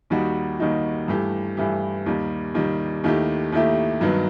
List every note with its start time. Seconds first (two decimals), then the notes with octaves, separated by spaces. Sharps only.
0.10 D#2 D#3 G3 D#4 F#4
0.59 D#2 D#3 G3 D#4 F#4
1.08 G2 E3 A3 E4 G4
1.57 G2 E3 A3 E4 G4
2.06 D#2 D#3 G3
2.54 D#2 D#3 G3
3.04 D#2 D#3 A3 E4 G4
3.52 D#2 D#3 A3 E4 G4
4.01 G2 D#3 F#3 B3